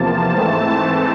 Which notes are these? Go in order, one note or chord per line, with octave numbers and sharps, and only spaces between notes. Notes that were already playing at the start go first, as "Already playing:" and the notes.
Already playing: E2 C3 F3 A#3 A5
G#2 E3 A3 C4